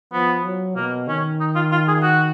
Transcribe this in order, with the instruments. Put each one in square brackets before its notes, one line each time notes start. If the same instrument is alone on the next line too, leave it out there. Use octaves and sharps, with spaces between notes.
[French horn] F3 [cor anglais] B3
[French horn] F#3
[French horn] B2 [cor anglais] A#3
[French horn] D#3 [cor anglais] C#4
[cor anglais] D#4
F4
F4
G#4
F#4